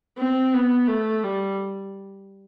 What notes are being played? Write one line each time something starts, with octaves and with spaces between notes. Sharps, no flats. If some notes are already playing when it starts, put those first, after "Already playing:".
C4
B3
A3
G3